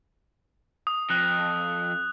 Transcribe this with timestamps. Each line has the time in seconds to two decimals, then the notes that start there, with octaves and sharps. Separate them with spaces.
0.87 D#6
1.10 F2 F#6